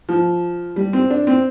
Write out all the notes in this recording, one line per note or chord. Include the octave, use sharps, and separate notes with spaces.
F3
G3
C4
D4
C4